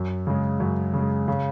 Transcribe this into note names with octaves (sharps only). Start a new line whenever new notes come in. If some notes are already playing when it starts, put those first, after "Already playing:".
Already playing: F#2
C#3 G#3
F#2
C#3 G#3
C#3